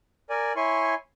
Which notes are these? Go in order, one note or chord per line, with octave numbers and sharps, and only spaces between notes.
A#4 D5 G#5
E4 C#5 G#5 C6 C#6